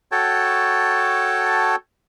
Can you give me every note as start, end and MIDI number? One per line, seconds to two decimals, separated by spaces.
0.12 1.75 66
0.12 1.75 69
0.12 1.75 73
0.12 1.75 79
0.12 1.75 81